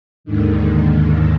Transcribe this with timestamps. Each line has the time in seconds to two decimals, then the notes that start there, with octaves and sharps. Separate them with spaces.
0.24 D#2 G#2 D3 D#3